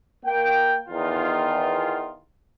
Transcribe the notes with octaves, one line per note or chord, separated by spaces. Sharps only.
A#3 G5
E2 D#3 F4